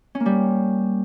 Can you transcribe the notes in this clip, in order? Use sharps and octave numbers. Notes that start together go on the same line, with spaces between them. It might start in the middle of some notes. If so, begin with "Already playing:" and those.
C#4
A#3
G3